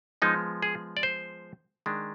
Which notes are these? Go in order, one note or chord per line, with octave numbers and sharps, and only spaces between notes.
F3 G#3 B3 D#4
G#4
D5
C5
D#3 G#3 D4